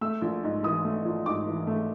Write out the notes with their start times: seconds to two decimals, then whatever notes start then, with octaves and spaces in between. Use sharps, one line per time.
0.01 A3 E6
0.22 A#1
0.44 G#2
0.63 E3 D#6
0.84 A3
1.05 A#1
1.26 G#2 D6
1.47 E3
1.67 A3